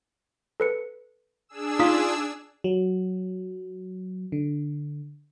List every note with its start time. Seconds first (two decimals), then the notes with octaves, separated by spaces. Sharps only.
0.60 A4 B4 C#7
1.49 D4 G#4 E6
1.79 D#4 F4 D#6 B6
2.64 F#3
4.32 D3